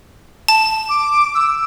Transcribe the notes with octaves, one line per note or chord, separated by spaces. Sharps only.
A5
D6
E6